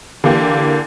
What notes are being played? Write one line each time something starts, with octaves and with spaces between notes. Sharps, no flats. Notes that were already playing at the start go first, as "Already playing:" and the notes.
D3 E3 A#3 G4